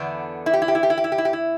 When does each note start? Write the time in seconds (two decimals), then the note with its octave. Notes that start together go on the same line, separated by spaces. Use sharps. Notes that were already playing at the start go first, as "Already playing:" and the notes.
Already playing: E2 D3 B3 D4
0.46 E4
0.53 G4
0.62 E4
0.68 G4
0.75 E4
0.83 G4
0.90 E4
0.98 G4
1.04 E4
1.12 G4
1.18 E4
1.25 G4
1.33 E4